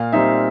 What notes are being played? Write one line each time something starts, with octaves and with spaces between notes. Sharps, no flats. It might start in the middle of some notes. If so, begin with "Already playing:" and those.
Already playing: A#2 F5
G3 C4 D#4 E5